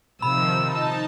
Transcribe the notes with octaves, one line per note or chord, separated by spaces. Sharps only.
C3 D#3 F3 B5 E6
D#4 A5